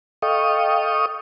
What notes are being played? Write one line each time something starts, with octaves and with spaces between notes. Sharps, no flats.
A4 D#5 F5 G5 C#6 D#6